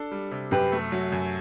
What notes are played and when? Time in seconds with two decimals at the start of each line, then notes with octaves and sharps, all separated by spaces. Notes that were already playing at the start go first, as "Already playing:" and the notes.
Already playing: D4 A4
0.12 G3
0.31 C3
0.51 F#2 G4 B4
0.72 A3
0.92 F#3
1.12 F#2